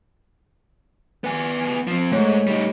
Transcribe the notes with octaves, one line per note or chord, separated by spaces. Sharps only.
B3 G#5
F3 C4
G#2 A3 C#5
G3 D#4